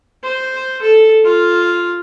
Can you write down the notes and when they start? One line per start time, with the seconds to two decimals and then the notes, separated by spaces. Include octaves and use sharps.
0.23 C5
0.82 A4
1.25 F4